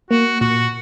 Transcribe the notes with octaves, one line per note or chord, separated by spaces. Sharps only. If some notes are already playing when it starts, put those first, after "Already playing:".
A#3 F#4
A#2 F#4